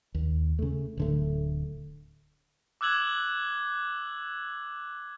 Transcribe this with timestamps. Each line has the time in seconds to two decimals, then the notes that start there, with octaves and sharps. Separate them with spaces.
0.15 D#2
0.59 C#3 A3
0.97 D1 D3 A3
2.81 D6 E6 F#6 G#6 F#7